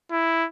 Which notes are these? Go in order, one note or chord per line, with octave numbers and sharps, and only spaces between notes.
E4